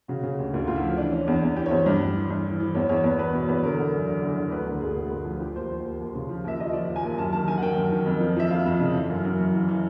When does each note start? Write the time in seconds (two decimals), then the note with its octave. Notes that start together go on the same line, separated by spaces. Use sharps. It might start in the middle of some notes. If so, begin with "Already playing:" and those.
0.08 C#3 F#4
0.23 C#3 G#4
0.38 D2 G4
0.54 D2 F4
0.67 D2 F4
0.76 E4
0.82 F3
0.97 E3 D4
1.12 E3 C#4
1.26 E2 D4
1.41 E2 C#4
1.56 E3 G4
1.66 C#5
1.71 E2 C5
1.86 G2
2.01 G2
2.15 E3
2.30 G2
2.45 E3
2.60 E3
2.74 E2 C#5
2.89 E2 C#5
3.04 E2 B4
3.18 E2 B4
3.34 B2
3.48 E2 B4
3.63 D3 A#4
3.78 D3
3.93 F#2
4.07 D3
4.22 D3
4.36 D3
4.51 D2 B4
4.67 D3 A#4
4.81 D2 G#4
4.96 D2
5.11 D2
5.25 F3
5.40 F3 G4
5.55 D#2 C5
5.70 D#2 C5
5.84 D#2
6.00 D#2
6.15 C#3
6.29 F3
6.44 D#2 E5
6.59 F3 D#5
6.73 F3 D5
6.88 D#2
6.96 G#5
7.03 D#2
7.18 F#2 A5
7.33 D#3 A5
7.48 D#3 G#5
7.58 F#5
7.61 D#3 G5
7.77 F#2
7.92 D#3
8.06 F2
8.20 F3
8.36 F3 E5
8.50 F2 F5
8.66 F2
8.80 C#3
8.94 E3
9.09 F#2
9.25 F#2
9.39 F#2
9.54 E3
9.68 E3